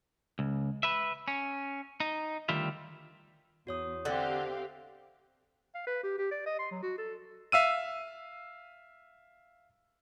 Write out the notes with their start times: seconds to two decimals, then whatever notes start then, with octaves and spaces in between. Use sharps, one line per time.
0.39 C#2
0.83 B4 E5
1.28 C#4
2.00 D#4
2.49 D2 D#3 G3 F4 E5
3.67 E2 F#4 C#5 D#6
4.05 D3 C4 G4 A4 E5 F5 F#6
5.75 F5
5.87 B4
6.03 G4
6.18 G4
6.31 D5
6.46 D#5
6.59 C6
6.71 F#3
6.83 F#4
6.98 A4
7.52 E5 F5 E6 D#7